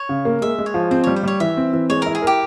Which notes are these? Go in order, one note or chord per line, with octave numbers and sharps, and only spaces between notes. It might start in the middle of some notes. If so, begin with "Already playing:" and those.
Already playing: C#5
C#3
A#3
G#3 E5
G#3
C#5
F3
C4 C5
G3 C#5
C5
G3 C#5
E3 E5
C4
E3
G#3 C#5
E4 A#4
G#4
G4 A#4